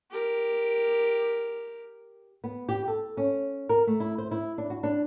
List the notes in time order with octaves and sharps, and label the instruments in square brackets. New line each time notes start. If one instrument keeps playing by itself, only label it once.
[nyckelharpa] G4 A#4
[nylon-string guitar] B3
G4
A4
C#4
A#4
A3
E4
C5
E4
D4
F#4
D4